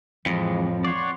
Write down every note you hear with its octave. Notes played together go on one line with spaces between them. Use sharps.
F2 A2 E3 F3 G#3
C#5 D5 F#5 C6